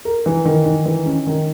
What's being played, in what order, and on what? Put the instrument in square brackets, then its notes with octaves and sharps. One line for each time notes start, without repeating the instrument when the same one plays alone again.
[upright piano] A#4
E3
D#3
D#3
E3
C#4
D#3